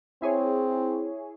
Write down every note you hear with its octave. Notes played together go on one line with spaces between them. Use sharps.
C4 E4 G#4 C#5